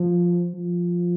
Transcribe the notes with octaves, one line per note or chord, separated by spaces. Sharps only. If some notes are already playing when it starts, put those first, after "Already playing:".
Already playing: F3
F3